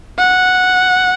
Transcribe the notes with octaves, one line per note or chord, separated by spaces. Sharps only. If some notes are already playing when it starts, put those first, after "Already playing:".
F#5